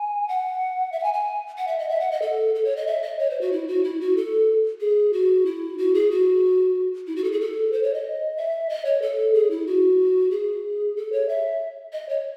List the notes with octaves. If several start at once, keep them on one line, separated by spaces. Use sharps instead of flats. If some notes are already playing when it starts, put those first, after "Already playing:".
Already playing: G#5
F#5
E5
F#5
G#5
G#5
F#5
E5
D#5
E5
F#5
D#5
A4
A4
C#5
D#5
E5
D#5
C#5
C5
F#4
E4
F#4
E4
F#4
A4
G#4
F#4
E4
F#4
G#4
F#4
E4
F#4
A4
G#4
A4
C5
C#5
D#5
E5
D#5
C#5
A4
G#4
E4
F#4
G#4
A4
C#5
E5
D#5
C#5